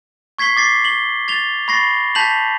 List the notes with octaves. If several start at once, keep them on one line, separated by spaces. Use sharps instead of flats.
C#6 G#6 B6 C7 G7
D6 A6 C7
F#7 G7
A6 F7 G7
B5 C#6 A6 A#6 C7
A5 G6 B6 F7 F#7